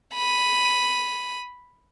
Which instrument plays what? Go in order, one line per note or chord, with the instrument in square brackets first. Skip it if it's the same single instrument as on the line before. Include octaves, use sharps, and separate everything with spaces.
[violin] B5 D#7